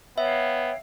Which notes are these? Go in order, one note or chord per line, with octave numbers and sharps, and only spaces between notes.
B3 C#5 E5 F5 G5